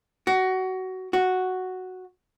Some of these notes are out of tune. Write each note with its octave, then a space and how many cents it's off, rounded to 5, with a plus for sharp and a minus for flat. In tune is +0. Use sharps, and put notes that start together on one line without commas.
F#4 +20
F#4 +0